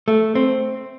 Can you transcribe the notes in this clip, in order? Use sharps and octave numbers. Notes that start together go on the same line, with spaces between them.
A3
C4